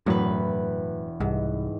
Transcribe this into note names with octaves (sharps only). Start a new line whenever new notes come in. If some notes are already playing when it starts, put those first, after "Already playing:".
E1 F#2 A2 F#3 B4
C2 G#2